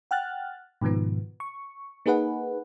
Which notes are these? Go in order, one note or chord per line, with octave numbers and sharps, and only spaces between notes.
F#5 G5 F6 F#6 A6
G#2 B2 D#3 F3 B3
C#6
A#3 D#4 G#4 B4 F#5